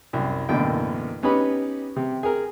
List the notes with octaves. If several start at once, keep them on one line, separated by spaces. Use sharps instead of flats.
C2 F#2
A1 F#2 B2 D3 A#3 G5
B3 C#4 D#4 G4 B4 B5
C3
G#4 A#4